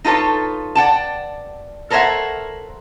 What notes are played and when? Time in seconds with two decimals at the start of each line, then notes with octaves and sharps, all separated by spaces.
0.05 D#4 F4 A4 B4 C#5
0.75 D5 F#5 G5 A5
1.90 A4 A#4 C5 C#5 E5 F#5